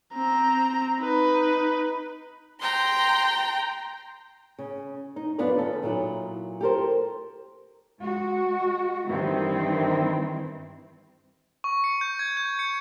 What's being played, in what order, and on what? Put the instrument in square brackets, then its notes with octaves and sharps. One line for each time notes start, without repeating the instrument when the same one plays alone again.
[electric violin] C4 A#5
D#4 B4
[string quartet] G5 A#5 C6
[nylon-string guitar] C#3
D#4
F#2 B3 D4 F4 B4 D5
D#2 C#3 A4
A#2 F#3 D#4 E4
G4 A4 A#4 C5
[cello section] G#3 F#4
G2 D#3 E3 C4 E4
[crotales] C#6
C#7
G6
G#6
G6
C#7